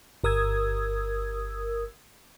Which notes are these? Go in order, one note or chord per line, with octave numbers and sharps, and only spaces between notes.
G1 A#4 D#6 E6 G#6